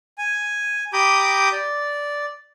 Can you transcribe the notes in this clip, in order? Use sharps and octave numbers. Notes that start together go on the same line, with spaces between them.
G#5
G4 A#5 B5 D6 D#6 G6
D5